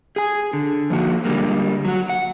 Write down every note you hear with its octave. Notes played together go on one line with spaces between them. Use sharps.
G#4 G#5
D3
F3 A#3 F#4
D3 G3 G#3 A#3
F#3 F#4
F#5